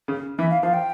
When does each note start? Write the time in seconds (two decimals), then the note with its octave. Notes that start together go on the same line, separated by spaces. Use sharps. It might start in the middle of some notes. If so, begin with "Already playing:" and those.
0.08 C#3
0.39 E3 E5
0.50 F5
0.62 F3 F5
0.74 G5